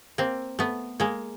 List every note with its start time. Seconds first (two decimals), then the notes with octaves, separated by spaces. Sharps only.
0.18 A#3 C4
0.59 A3 B3
1.00 G#3 A#3